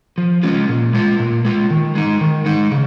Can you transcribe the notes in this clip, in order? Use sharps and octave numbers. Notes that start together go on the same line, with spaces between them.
F3
G#3 C#4 F4
A#2
G#3 F4
A#2
G#3 F4
D#3
G#3 D#4
D#3
G#3 D#4
C#3